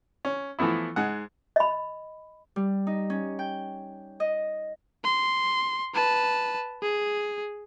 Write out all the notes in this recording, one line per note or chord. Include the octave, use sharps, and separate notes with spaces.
C#4
E3 F3 A3 B3 E4
G#2 G#3 F#5
D#5 B5
G3
D#4
C#4
G5
D#5
C6
B4 A5
G#4